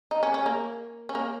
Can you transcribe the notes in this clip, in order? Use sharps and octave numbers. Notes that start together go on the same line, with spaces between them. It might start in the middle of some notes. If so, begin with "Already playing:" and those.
D#4
C#4
C#4
A#3
C#4
A#3